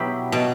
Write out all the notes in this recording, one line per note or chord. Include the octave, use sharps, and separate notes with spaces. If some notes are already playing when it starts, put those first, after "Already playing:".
Already playing: B2 F#3 B3 E4 G4
B2